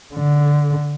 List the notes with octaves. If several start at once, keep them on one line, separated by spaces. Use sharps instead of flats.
D3